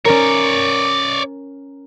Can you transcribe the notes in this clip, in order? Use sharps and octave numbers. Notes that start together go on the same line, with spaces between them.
C#4 A#4 C#5 D5